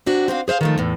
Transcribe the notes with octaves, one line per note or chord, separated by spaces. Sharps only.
C3 D4 F#4
C4 D4 F#4 F5
G#4 C5 E5 F5
D#3 F3 A3
E2 A2